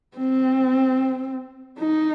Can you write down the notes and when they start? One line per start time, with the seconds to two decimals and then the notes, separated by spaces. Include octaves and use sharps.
0.17 C4
1.79 D#4